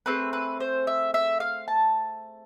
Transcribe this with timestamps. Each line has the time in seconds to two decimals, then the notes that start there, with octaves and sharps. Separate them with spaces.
0.06 A3 C4 G#4 B4
0.33 B4
0.60 C5
0.87 E5
1.14 E5
1.40 F5
1.68 A5